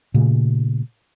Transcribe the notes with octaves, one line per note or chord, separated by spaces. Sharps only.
A#2 C#3 A3